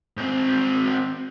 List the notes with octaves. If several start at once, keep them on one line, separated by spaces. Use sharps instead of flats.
G#2 C4